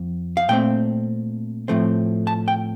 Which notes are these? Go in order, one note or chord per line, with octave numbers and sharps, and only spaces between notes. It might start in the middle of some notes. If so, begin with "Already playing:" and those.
Already playing: F2
F5
A#2 A3 C4 G5
A2 F3 A3 C4
A5
G5